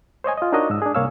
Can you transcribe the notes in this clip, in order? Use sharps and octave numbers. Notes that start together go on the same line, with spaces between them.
C5 C#5 D#5 G#5
F4 D#5
D4 D#4 F#4 A#4 C#5 D#5
G#2 E6
D4 G#4
C2 A#3 C#5 F5 E6